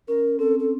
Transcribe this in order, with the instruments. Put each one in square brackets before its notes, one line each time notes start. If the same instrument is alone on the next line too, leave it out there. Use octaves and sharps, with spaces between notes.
[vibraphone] C#4 [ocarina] A#4
[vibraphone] C4 [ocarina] A4
[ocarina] A4